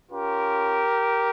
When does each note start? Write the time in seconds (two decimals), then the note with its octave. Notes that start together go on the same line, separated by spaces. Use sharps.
0.10 C#4 F4 G4 A#4